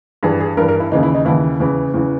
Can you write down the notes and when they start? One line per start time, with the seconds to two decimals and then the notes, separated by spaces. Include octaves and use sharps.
0.23 G2 E3 G#4
0.40 G#4
0.57 G2 A#4
0.60 E3
0.68 A#4
0.80 E4
0.92 D#2 C#3 E3 D#4
1.03 E4
1.14 D#4
1.25 D#2 C#3 E3 E4
1.60 E2 C#3 E3
1.94 E2 C#3 E3